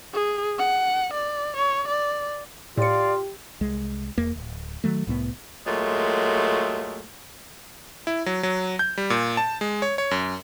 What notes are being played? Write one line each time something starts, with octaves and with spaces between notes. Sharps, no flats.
G#4
F#5
D5
C#5
D5
A2 F4 G4 D5 F5 C#7
C2 G#3
E1 E2 A#3
D1
D#3 F#3 A3
C2 A2 A3 B3
A#2 F#3 G#3 A3
E4
F#3
F#3
G6
G3
A#2
A5
G#3
C#5
C#5
F#2